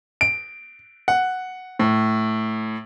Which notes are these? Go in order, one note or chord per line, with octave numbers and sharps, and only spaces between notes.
D7
F#5
A2